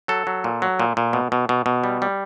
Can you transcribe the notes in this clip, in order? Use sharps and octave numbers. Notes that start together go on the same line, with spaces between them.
F#3 A4
F#3
A#2
F#3
A#2
A#2
B2
B2
B2
B2
G3
G3